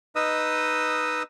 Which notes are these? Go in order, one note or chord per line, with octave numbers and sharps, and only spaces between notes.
D#4 B4 D#5 D#6 E6